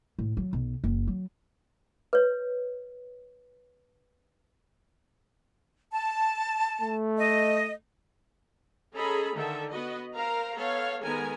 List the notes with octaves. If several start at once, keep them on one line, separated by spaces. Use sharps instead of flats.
A2
F#3
B1
F#1
F#3
B4 C#5
A5
A3
D#5
C#4 G#4 A4 D#5 A#5 B5
D3 D#3 A4 E5
B3 F#4 B4 D#5
A#4 C5 F5 A#5
B3 A4 C#5 F5
D#3 G#3 B3 A4 A#4 G#5